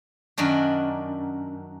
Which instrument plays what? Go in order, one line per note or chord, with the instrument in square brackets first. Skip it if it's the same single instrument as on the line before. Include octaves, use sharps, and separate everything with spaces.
[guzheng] F#2 D#3 D4 F#4